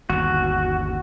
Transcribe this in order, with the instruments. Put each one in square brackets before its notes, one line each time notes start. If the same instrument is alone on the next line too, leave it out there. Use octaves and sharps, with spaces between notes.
[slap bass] G1 D#2 [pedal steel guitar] F#4